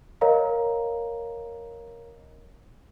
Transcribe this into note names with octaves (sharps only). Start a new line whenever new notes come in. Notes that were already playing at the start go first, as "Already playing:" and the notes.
A#4 C#5 D#5 F5 A#5